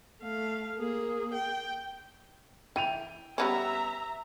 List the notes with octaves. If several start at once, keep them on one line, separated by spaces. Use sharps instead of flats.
A3 F5
A#3 G#4
G5
E3 G5 D#7 F7
G3 B3 C#4 E5 A#5